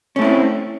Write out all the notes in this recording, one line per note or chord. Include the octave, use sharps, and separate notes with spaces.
A3 C4 C#4 E4